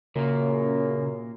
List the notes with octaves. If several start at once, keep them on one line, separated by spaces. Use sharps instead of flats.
F#2 A#2 C#3 A#3